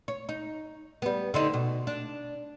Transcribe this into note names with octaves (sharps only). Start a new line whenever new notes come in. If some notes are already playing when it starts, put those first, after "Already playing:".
C#5
D#4
G3 B3
D3 C4 D#4
B2
D4